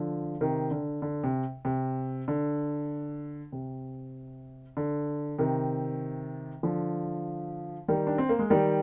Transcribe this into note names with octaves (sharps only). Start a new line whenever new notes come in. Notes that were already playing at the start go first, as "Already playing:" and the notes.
Already playing: D3 F3
C3 D#3
D3
D3
C3
C3
D3
C3
D3
C3 D#3
D3 F3
D#3 G3
D4
C4
A#3
G#3
D#3 G3